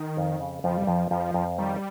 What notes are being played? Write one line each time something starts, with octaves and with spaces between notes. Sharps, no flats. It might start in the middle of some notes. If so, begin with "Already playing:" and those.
Already playing: D#3
F2
C#3
F2 F3
G3
F2 F3
F2 F3
F2
D#3 G3